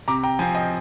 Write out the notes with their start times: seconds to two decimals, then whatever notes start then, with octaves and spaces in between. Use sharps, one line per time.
0.08 C3 A#5 D6
0.23 G5 A#5
0.39 F3 C4 F5 G#5
0.55 D#5 G5